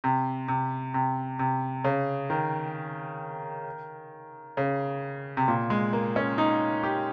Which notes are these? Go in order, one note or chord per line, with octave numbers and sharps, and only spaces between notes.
C3
C3
C3
C3
C#3
D#3
C#3
C3
A#2
G#3
A#3
C#4
D#4
G4